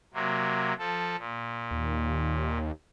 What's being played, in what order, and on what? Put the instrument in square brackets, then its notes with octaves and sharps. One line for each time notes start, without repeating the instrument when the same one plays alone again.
[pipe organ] C3 F#3 A#3
F3 A4
A#2
[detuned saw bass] D#2